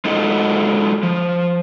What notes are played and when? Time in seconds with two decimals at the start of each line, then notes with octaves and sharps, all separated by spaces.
0.05 G#3 D#4 F4 F#4 A4 D#5
1.03 F3